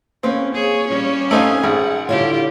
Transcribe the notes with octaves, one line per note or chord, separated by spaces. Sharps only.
A#3 C4 C#4 B4 F5
G#4 C#5
G3 C#4
A3 C4 D#4 F5 G#5
G#1 G#4 F#5
D3 G3 E4 F4 G4 C#5